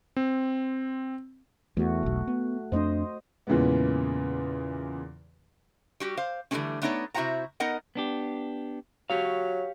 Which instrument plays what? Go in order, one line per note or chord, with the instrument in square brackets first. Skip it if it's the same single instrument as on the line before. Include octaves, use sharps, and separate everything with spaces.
[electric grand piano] C4
[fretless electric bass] E2 [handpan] A3 F#4
[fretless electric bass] E1 B1
B3
[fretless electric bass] F2 A3 D4 [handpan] C5 D#5
[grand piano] E2 A#2 C#3 E3 G#3 B3
[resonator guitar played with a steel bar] G3 F#4 G4
C5 F5
D3 E3 F3 G3 A3 C#4
A3 B3 D4 D#4 C#5 D5
C3 E4 F#4 C5 F#5 A#5
B3 D#4 A#4 D#5 F#5
[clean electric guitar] B3 D4 G4
[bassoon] F#3 [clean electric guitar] G4 C#5 F5